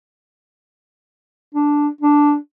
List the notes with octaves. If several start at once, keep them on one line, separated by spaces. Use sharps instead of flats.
D4
D4